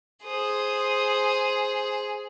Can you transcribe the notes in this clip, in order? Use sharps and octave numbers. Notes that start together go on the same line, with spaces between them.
G#4 C5 D#6